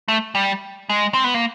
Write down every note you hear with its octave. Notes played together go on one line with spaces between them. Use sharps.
A3
G3
G#3
C4
B3
A#3